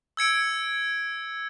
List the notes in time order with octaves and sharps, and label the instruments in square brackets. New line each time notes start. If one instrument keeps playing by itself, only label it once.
[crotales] E6 G#6 C#7 D7